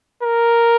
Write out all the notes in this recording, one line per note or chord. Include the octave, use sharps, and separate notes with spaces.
A#4